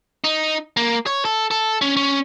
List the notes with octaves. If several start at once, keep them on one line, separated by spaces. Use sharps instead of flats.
D#4
A#3
C#5
A4
A4
C#4
C#4